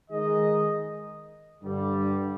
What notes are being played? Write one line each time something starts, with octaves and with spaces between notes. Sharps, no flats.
D#3 G#3 D#4 G#4 D#5
G2 D3 G3